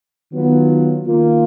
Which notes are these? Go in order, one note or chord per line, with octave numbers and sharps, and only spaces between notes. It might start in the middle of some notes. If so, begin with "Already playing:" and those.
D#3 F#3 B3 F4
D#3 A#3 F4